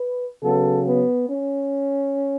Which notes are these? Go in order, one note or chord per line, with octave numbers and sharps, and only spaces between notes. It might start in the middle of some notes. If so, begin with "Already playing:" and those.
Already playing: B4
C#3 F#3 B3 A4
B3
C#4